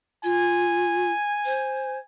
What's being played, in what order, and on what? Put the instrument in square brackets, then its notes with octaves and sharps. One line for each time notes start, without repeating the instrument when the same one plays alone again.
[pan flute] F4 [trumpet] G#5
[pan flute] C5